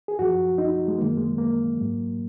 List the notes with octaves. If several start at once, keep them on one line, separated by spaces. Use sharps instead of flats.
G#4
F#2 F3 F#4
D#4
G#3
F#2 D#3 F#3 A#3
G#3
A#3
G#2 F#3